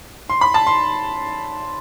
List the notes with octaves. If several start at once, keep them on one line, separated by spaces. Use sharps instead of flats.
C6
B5
A5
C6